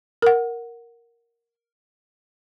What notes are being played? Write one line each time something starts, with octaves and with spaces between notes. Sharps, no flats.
A#4 F#5